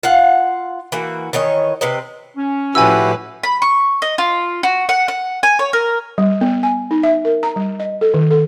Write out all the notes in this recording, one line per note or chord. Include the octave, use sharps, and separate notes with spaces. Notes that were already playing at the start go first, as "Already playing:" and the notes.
F4 F5 F#5
E3 A#3 F#4
D#3 E3 C#5 D#5
C3 C4 B4 D#5
C#4
A2 F3 E4 F#4 G4 B4 G#5 E6
B5
C#6
D#5
F4
F#4
F#5
F#5
G#5
C#5
A#4
G3
B3
G#5
D#4
E5
A#4
A#5
G3
D#5
A4
D#3
A4